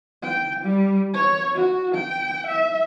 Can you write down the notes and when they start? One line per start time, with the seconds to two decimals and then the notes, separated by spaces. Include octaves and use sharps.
0.23 G5
0.63 G3
1.13 C#5
1.54 F#4
1.94 G5
2.47 E5